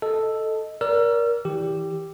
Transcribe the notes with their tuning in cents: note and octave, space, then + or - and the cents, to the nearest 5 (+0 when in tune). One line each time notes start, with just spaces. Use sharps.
A4 +0 D#5 +0
A#4 +20 D5 -30 E6 +40
E3 -25 G4 +0